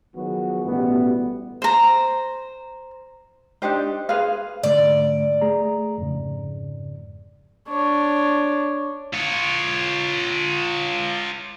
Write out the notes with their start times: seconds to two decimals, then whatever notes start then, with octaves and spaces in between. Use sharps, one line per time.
0.15 D#3 F3 F#3 B3 F#4 G#4
0.65 A1 B2 G3 A3 B3
1.62 C5 A#5
3.62 D4 D#4 G4 C5
4.09 G#4 B4 C5 F5
4.63 G#2 D3 A3 D5
5.41 A3 G#4 A#5
5.98 F2 G#2 C#3
7.69 D4 C#5
9.14 F4 C#5